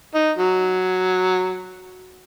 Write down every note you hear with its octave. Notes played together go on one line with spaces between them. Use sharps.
D#4
F#3